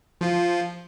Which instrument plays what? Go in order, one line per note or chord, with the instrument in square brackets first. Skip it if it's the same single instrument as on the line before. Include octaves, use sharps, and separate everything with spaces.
[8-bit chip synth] F3 F4